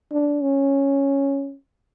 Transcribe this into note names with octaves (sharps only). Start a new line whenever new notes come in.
D4
C#4